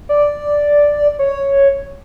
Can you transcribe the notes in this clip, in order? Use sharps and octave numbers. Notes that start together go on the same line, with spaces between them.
D5
C#5